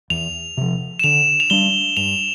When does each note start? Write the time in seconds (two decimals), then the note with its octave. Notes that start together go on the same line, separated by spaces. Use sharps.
0.10 E2 F7
0.57 C3 F3
0.99 E7
1.04 D3 F7
1.40 F7
1.50 G3 D4 G7
1.97 G2 F7